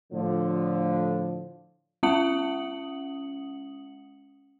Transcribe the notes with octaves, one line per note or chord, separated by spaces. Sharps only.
A2 D3 F3
G#3 C#4 F#5 D#6 C#7 F#7